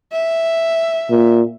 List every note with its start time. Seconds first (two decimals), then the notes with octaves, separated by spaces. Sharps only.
0.12 E5
1.10 A#2